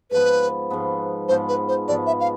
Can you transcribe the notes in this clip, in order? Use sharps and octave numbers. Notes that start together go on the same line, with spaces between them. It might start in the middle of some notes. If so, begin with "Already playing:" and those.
G#2 F3 B3 B4
G#2 F3 B3
G#2 F3 B3 C5
B4
C5
G#2 F3 B3 D5
E5
F5